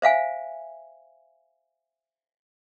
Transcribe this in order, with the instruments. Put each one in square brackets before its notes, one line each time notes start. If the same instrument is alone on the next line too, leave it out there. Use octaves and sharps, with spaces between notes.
[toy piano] C5 E5 F5 G#5